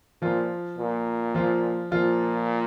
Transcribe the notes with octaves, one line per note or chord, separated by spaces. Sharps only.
A#2 F3 F4
A#2
F3 F4
A#2 F3 F4